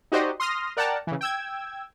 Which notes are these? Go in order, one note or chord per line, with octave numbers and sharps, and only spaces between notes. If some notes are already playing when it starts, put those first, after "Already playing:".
D#4 F#4 G4 C5 D5 D#5
C6 D#6 F6 A#6
A#4 D5 F#5 G5 A5 A#5
C#3 E3
G5 E6 G#6